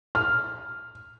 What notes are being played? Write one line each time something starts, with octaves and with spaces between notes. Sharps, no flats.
F6